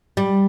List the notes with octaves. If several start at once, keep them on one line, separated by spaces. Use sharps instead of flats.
G3